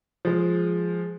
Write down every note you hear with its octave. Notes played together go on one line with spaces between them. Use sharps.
F3 G#3